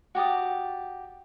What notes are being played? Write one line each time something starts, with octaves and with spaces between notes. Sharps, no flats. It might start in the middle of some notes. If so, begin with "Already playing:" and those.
F#4 G4 A5 D#6